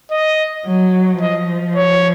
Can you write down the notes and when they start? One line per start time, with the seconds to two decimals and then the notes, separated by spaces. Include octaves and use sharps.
0.11 D#5
0.67 F#3
1.21 F3 D#5
1.75 C#5